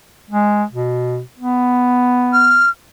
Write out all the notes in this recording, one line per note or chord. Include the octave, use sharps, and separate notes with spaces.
G#3
B2
B3
F6